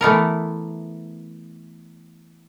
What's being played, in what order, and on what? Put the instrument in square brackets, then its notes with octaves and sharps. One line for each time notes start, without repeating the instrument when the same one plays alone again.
[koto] E3 A3 B3 A#4